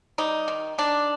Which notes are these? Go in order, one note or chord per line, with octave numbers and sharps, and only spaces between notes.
G3 D#4
D#3
D#3 D4